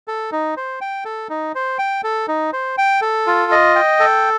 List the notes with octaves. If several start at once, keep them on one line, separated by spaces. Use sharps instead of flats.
A4
D#4
C5
G5
A4
D#4
C5
G5
A4
D#4
C5
G5
A4
F4
D#5
G5
A4